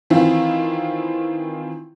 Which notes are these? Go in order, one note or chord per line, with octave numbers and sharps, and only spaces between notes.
D#3 E3 C4 E4 F4